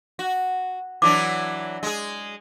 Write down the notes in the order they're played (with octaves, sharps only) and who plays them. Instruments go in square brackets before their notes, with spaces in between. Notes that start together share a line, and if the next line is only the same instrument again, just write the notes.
[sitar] F#4
[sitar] E3 F#3 D4 [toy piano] D6
[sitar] G#3 G#4